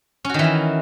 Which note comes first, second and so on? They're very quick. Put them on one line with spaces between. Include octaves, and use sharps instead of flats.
C#4 F#4 D#3 E3 E4